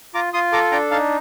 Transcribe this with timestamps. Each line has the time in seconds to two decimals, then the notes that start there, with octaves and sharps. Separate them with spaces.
0.14 F4 A#5 D6
0.33 F4 C6 D#6
0.52 A4 A#5 D6
0.72 D4 G5 A#5
0.91 D#4 F5 A5